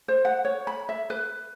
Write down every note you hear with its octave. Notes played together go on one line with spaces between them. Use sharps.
C5
F#5
C#5
B5
E5
B4